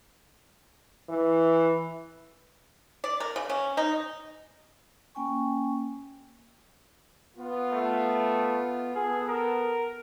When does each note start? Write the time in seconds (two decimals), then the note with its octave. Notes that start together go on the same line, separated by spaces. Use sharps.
1.09 E3
3.04 D5
3.20 A#4
3.36 C#3
3.50 C#4
3.77 D#4
5.15 A#3 C#4 G5 G#5 C#6
7.37 B3 F4
7.72 A3
8.95 B3 G#4 A4
9.28 A#4